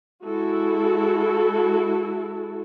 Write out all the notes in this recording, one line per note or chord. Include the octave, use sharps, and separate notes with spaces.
G#3 E4 F#4 A4